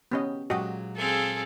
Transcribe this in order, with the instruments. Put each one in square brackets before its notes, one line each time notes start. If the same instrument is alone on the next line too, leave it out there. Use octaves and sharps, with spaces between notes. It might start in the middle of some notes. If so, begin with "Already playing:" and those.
[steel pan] B3 C#4 D#5 [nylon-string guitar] G4
[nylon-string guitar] A#2 F#3 G#3 [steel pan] F#4 G4 D#5
[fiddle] C4 F5 [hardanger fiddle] G#4 A4